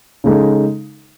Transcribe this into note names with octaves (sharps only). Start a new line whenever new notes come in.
C#3 G#3 D#4 A4